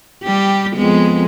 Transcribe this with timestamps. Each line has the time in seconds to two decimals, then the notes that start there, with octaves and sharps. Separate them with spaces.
0.24 G3 G4
0.77 F2 G#3 B3